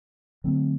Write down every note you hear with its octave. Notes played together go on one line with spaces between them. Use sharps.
D3 F#3 A3 C4